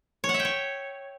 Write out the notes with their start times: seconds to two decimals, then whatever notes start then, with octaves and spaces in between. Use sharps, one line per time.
0.24 C#5
0.29 F#5
0.34 E5
0.39 G5
0.45 C#5